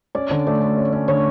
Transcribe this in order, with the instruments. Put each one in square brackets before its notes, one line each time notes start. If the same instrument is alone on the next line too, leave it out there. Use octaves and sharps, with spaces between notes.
[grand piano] C#4 [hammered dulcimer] D5
[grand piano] D3 [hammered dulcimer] D5
[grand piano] A3 [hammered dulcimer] D5
[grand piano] A3
C#4
C#4
[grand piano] D3 [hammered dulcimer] C#5